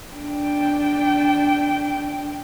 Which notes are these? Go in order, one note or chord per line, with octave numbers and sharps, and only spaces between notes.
D4 G5